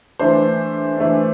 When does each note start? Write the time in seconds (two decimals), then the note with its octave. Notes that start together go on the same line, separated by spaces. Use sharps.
0.19 E3 A3 D4 C5
0.97 E3 A3 D4